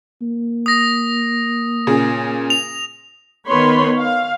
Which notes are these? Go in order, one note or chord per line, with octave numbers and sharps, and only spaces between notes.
A#3
D#6 A#6
A#2 C#3 G#4
F7
D#3 B3 C#5 B5 C6
F5